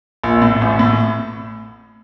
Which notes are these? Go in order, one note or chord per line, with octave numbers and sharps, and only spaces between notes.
A#1
A2
A1
A2